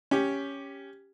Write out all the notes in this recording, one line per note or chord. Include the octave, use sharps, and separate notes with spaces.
C#4 G4